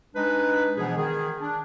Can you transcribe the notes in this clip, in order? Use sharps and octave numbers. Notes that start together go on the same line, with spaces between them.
G#3 D4 D#4 B4
B2 E3 F3 G#3 B3 G#4
D#3 G#4
D4